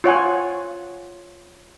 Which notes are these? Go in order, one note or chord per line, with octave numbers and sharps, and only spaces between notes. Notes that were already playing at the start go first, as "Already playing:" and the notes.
F4 C#5 F#5 G#5